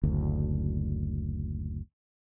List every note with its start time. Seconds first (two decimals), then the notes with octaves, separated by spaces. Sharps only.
0.03 F#1 D2